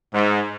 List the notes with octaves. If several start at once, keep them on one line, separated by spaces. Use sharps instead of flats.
G#2